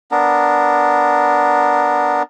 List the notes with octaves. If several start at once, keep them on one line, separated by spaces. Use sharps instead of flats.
B3 D4 A#4